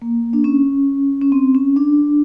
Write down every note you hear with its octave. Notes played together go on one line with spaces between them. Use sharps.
A#3
D4
C#4
C#4
C4
C#4
D4